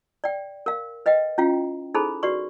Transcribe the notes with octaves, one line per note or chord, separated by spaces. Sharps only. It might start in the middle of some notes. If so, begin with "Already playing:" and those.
D5 G5
A#4 F5
B4 D#5 F5 G5
C#4 E4 F4 F5 G5
D#4 E4 G#4 A4 C5 B5
F#4 B4 D5 C#6